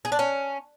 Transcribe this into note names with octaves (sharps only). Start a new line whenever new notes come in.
G#4
D4
C#4